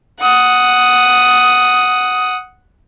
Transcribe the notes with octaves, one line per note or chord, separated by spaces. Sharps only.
F#5 D#6